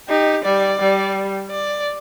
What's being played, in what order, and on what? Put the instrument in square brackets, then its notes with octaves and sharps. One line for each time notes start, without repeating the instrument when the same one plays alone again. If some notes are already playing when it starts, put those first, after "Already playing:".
[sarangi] D#4 [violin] G4
[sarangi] G3 [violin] D5
[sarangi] G3
[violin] D5